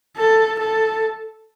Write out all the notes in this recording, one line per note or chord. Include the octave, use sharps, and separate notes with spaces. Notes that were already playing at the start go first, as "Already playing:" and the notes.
A4
A4